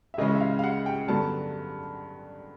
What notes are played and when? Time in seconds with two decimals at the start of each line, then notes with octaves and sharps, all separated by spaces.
0.14 E5
0.18 C#2 C#3 E3 G#3 C#4 D#5
0.35 E5
0.40 F5
0.59 F5
0.64 F#5
0.86 G5
1.08 G2 D3 F#3 B3 A5